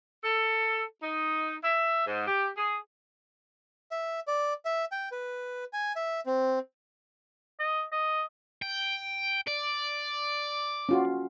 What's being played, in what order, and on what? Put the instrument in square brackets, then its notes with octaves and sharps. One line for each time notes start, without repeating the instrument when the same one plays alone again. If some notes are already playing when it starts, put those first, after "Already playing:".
[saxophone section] A4
D#4
E5
G#2
G4
G#4
[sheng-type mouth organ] E5
D5
E5
G5
B4
G#5
E5
C4
[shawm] D#5
D#5
[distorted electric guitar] G5
D5
[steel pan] C#4 F4 F#4